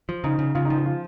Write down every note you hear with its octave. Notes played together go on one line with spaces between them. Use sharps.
F3
C#3 D#4
C#3
C#3 F4
D#4
F3
F4
F4